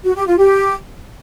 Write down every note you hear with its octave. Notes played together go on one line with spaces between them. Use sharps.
F#4
G4
F4
G4